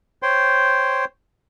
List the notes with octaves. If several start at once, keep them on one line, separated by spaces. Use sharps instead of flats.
C5 C#5 G5 C6